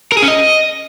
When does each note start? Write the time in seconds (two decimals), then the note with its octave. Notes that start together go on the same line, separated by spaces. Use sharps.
0.12 A#4
0.17 G#4
0.23 C#4
0.28 D#5